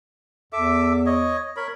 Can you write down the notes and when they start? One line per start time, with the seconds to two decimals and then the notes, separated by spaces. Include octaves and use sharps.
0.53 E2 A4 E5 D6
1.06 C#5 D#5
1.56 A#4 C#5 B5